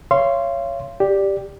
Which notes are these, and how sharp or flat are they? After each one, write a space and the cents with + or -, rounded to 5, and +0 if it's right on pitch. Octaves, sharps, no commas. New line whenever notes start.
C#5 +0 F5 -35 C6 +0
G4 +0 D5 +0